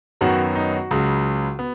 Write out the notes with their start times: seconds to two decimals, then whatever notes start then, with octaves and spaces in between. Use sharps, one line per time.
0.21 F#2 D#3 F#3 B3 F#4
0.55 D#4
0.73 F#4
0.91 C#2 C#3 F#3
1.59 B3